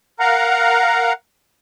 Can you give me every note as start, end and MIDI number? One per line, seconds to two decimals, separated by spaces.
0.20 1.13 70
0.20 1.13 77
0.20 1.13 78
0.20 1.13 82